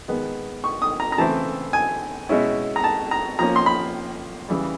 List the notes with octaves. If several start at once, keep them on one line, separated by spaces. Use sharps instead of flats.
D#3 G#3 B3
C#6
D#6
A#5
A#5
C#3 E3 A3 C4 E4 A5
G#5
B2 G#3 C#4 E4
A#5
A5
A#5
F3 A#3 C#4 A#5
C6
B5
C#3 E3 G3